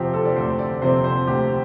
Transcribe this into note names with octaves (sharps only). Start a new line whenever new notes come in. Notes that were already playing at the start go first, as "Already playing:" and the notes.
Already playing: D2 C3 F3 C4 F4 G4
A4
D5
D2 C5
D5
C3 F3 C4 C5
C5
D2 G4